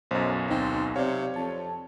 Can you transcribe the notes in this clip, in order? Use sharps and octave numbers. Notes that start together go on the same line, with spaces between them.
B1 F#2 C5 D#5
D2 C4 D#4
C3 C#5 D5 F5
F2 A5